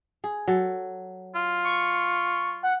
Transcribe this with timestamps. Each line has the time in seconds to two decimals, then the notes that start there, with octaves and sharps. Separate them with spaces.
0.24 G#4
0.48 F#3 A4
1.35 F4
1.64 C#6
2.63 F#5